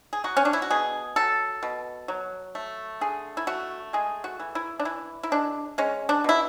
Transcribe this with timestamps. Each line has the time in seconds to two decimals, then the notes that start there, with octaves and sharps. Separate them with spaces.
0.13 G#4
0.24 F#3 F#4
0.37 C#4
0.45 D4
0.53 E4
0.62 F#4
0.70 B2 G#4
1.16 F#3 A4
1.63 B2
2.08 F#3
2.55 A3
3.01 D3 G#4
3.37 E4
3.47 A3 F#4
3.93 G#3 G#4
4.24 F#4
4.40 E3
4.55 E4
4.80 D4
4.85 E3 E4
5.23 E4
5.32 G#3 D4
5.78 G#3 C#4
6.09 D4
6.24 B2 E4